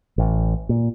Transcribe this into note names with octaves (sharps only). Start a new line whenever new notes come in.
A1
A#2